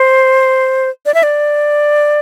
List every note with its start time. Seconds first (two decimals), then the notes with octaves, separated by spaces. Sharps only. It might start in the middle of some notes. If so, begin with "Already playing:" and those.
Already playing: C5
1.06 D5
1.14 E5
1.23 D5